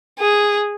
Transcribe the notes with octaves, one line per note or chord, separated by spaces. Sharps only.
G#4